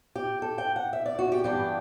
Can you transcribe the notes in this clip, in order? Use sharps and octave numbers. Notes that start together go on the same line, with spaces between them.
G4
A4
G5
F#5
E5
D5
F#4
G4
G2 E3 B3 D4 G4